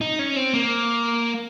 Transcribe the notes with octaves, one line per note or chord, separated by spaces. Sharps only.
D#4
C#4
C4
A#3